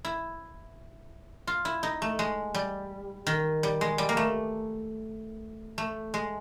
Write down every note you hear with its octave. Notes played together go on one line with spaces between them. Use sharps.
E4
F4
E4
D#4
A3
G#3
G3
D#3
G3
G#3
G3
A#3
A3
A3
G#3